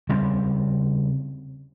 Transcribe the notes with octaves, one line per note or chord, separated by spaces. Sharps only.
C#3 G3 C4